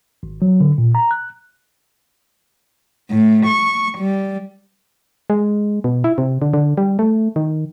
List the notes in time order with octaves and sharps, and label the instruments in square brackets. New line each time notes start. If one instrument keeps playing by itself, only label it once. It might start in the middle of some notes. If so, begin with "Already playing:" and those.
[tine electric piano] G#1
F#3
D3
A#2
A#5
F#6
[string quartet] A2
C#6
G3
[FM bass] G#3
B2
E4
C3
D3
D3
G3
A3
D#3